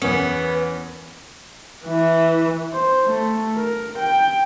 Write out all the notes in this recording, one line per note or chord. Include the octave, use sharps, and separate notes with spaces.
E2 B3 C#4 A#4
E3
C5
A3
A#4
G5